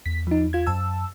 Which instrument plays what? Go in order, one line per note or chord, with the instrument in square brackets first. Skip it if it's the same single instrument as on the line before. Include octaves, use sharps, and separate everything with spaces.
[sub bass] E2 [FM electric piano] B6
[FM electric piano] F3 D#4
F4 G#6
F#2 A5 E6